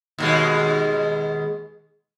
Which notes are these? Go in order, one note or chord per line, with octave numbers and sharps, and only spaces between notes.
D#2 B2 G#3